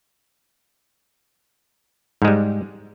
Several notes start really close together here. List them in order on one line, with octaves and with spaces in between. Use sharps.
G#2 G#3 G3